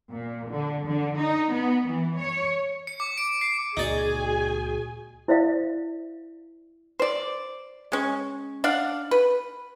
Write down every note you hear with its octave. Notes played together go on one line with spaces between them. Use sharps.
A#2
D3
D3
D#4
B3
E3
C#5
C#7
D6
D7
C7
C#2 A#2 D#4 F#4 G#4 D5 G#5
E4 C5 D5 E5 F5
C5 D5
G#3 C#4
D4 D5 F5 F#5
B4